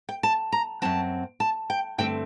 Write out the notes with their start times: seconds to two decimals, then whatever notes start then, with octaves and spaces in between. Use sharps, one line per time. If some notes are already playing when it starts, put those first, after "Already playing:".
0.09 G5
0.23 A5
0.52 A#5
0.82 F#2 F#3 C4 A5
1.40 A5
1.70 G5
1.98 G2 D3 A3 C4 G5